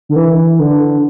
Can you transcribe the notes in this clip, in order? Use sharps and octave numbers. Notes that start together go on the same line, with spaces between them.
D3
E3
D3